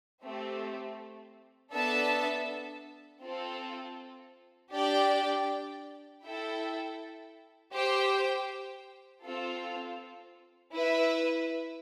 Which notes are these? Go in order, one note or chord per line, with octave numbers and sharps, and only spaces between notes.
A3 C4 G4
B3 D4 A4 E5 A5
C4 F4 A4
D4 G4 D5 G5
E4 A4 E5 G5
G4 C5 G5
C4 F4 A4
E4 B4 E5